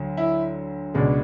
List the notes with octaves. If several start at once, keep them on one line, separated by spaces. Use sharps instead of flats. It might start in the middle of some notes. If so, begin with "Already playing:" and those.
Already playing: D2 D3 F#3
E4
C#2 B2 G#3 D4